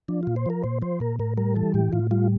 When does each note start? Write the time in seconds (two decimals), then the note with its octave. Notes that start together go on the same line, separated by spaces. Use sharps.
0.08 F3 D4
0.23 A#2 F4
0.36 C5
0.46 F3 A#4
0.64 A#2 C5
0.82 F3 C5
1.00 A#2 A#4
1.19 A2 A#4
1.37 G3 A#4
1.56 E3 A4
1.74 A2 G4
1.93 A2 F4
2.11 G3 F4